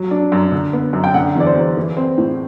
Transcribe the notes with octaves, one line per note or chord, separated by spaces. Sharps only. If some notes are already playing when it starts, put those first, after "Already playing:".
Already playing: F#3
D4
F#2
D3
B3
F#2
G5
D3 F#5
E2 D5
C5
E2
E3
C4
A2